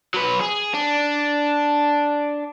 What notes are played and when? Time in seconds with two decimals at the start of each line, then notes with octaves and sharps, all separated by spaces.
0.14 F#3 B4
0.41 G#4
0.74 D4